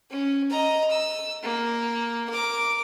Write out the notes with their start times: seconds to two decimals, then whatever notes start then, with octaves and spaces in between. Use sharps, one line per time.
0.11 C#4
0.50 D#5 A#5
0.91 E6
1.43 A#3
2.29 A#4 D6